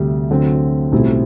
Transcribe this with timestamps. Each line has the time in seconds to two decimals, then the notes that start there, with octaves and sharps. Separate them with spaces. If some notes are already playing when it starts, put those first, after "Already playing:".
Already playing: D2 C3 G3
0.29 D2 D3 F#3 C4
0.92 B1 A2 G3 C4 E4